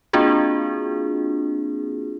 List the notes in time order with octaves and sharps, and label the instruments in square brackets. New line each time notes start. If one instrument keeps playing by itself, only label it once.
[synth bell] A#3 C4 D4 F4 F#4 G#4